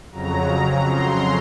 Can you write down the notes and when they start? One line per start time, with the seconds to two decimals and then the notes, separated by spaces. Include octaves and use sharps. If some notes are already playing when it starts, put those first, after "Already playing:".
0.11 F2 C#3 F#3 A#5
0.90 C6